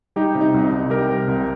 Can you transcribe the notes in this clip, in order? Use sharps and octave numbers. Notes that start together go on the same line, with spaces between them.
G3 D#4 G4
C3
D#4
C2
C2
G3 G4 A#4
C3
C2